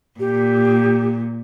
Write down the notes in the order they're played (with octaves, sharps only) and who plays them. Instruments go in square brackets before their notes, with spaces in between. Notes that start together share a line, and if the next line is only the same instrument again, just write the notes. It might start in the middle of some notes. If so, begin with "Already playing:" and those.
[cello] A#2 [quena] G4